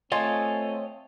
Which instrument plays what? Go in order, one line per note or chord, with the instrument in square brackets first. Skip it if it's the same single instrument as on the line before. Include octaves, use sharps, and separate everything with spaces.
[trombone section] A3 C4 [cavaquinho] F4 [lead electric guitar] C#5 D#5 [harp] G#5 A5